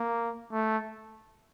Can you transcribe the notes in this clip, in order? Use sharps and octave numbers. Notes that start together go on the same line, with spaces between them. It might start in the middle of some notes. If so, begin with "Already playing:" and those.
Already playing: A#3
A3